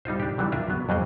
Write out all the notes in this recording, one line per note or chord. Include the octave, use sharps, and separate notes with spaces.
G3 D#4 F4 C5
D4 G4
C3 E3 F#3 G3
D4 F4 A#4 E5
F#3 B3
F2 F#3 G3 C5 D#5